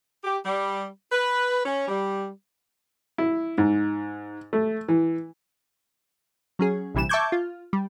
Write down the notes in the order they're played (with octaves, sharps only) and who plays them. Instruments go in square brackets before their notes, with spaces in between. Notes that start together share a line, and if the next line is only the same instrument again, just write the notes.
[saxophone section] G4
G3
B4
C#4
G3
[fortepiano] E4
G#2
A3
E3
[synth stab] F#3 C#4 G#4
A#1 C3 E3 G3 E7
E5 A5 C#6 D6 G6 G#6
F4
G3